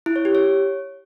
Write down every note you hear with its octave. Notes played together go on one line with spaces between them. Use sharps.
E4
C#5
G4
C#5